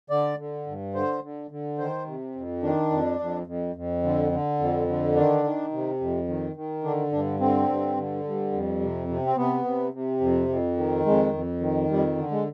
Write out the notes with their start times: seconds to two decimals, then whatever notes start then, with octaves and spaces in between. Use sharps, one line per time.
0.10 D3 D5
0.38 D3
0.67 G2
0.94 D3 C5
1.23 D3
1.51 D3
1.78 D#3 C5
2.06 C3
2.35 F2
2.62 D#3 D4
2.91 F2
3.19 F2
3.47 F2
3.76 F2
4.03 D3
4.32 D3
4.59 F2
4.88 D3
5.15 D#3 D4
5.44 D#3
5.72 C3
6.00 F2
6.28 D#3
6.56 D#3
6.84 D3 D4
7.12 G2 D4
7.40 D3 C4
7.68 G2
7.97 D3
8.24 G2
8.52 F2
8.81 C3
9.08 C3
9.26 C4
9.36 C3 B3
9.64 C3
9.93 C3
10.20 F2
10.48 F2
10.77 D#3
11.05 F2 G#3
11.33 F2
11.61 D#3
11.89 F2 G3
12.17 D3
12.31 G#3